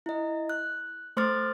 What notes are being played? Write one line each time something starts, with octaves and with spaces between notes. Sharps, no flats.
E4 D#5
F#6
A3 C5 C6 D6 F6 A6